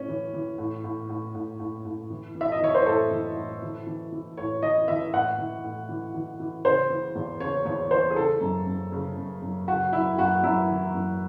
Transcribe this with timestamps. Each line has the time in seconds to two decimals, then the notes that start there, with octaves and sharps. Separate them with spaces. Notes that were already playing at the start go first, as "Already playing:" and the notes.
Already playing: A2 C#4
0.08 E3
0.33 E3
0.58 A2
0.84 A2
1.10 A2
1.34 A2
1.59 A2
1.85 A2
2.10 E3
2.35 E3
2.41 E5
2.52 D#5
2.60 E3 C#5
2.75 C5
2.86 A2 A4
3.11 E3
3.36 A2
3.62 E3
3.87 E3
4.12 E3
4.37 A2 C#5
4.62 E3 D#5
4.88 E3 E5
5.13 A2 F#5
5.38 E3
5.64 A2
5.89 E3
6.14 E3
6.40 E3
6.65 C#3 C5
6.90 E3
7.16 E2
7.40 C#3 C#5
7.66 E2 C#5
7.91 E3 C5
8.10 G#4
8.16 C#3 A4
8.41 F#2
8.67 F#2
8.92 C#3
9.17 F#2
9.42 F#2
9.68 C#3 F#4
9.93 F#2 E4
10.18 F#2 F#4
10.44 F#2 E4
10.69 E3
10.95 F#2